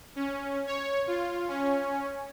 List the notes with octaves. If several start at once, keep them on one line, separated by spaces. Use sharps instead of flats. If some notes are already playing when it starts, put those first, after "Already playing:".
C#4
C#5
F4
C#4